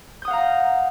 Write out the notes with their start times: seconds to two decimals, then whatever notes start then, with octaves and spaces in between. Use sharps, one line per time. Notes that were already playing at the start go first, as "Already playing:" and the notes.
0.22 G6
0.25 D#6
0.28 F#5
0.30 F5
0.33 A#5